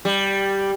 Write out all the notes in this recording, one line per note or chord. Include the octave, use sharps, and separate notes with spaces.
G3